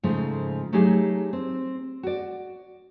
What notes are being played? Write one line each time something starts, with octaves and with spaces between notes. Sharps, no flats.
G#2 C#3 F3 A3
F#3 A3 D#4 G4 G#4
C4
F#4 D5